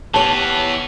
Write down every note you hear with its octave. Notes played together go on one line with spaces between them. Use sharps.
E3 B3 G4 C#5 A5